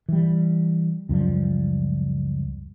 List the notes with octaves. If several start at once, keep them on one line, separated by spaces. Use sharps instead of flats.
E3 G3
C#2 F#2 F3 G3